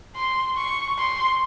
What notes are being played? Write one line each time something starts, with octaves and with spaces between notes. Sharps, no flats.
C6
C#6
C6